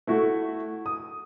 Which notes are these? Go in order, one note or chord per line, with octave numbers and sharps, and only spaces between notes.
A3 E4 F#4
D#6